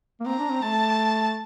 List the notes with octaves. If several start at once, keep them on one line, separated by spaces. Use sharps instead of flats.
A#3
C4 A#5
D4
C4
A3 A5